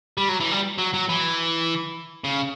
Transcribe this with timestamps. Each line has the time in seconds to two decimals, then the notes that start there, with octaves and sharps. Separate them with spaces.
0.18 G3
0.29 F#3
0.41 E3
0.52 G3
0.79 F#3
0.94 F#3
1.09 E3
2.24 C#3